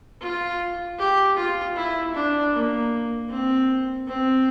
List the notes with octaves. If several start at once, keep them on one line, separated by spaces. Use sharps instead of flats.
F4
G4
F4
E4
D4
A#3
C4
C4